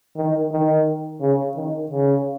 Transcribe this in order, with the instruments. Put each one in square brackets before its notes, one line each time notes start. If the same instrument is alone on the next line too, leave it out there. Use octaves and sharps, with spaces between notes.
[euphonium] D#3
D#3
C#3
D#3
C#3